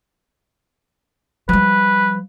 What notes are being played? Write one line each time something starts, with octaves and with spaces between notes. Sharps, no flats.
F3 G3 B4